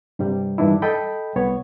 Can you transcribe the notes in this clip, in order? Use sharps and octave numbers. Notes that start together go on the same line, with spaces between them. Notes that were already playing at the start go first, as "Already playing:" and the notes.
G2 C3 G3
G2 D#3 E3 D4 E4
A4 D#5 G5 B5
C2 B3 C#5